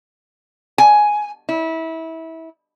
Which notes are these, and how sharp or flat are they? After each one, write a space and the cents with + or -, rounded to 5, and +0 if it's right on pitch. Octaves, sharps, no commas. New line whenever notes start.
G#5 +10
E4 -25